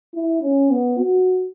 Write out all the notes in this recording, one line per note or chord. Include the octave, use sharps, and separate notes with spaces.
E4
C#4
B3
F#4